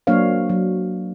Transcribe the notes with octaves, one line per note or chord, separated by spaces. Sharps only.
F#3 A#3 D4 C5 C#5 F5
F#3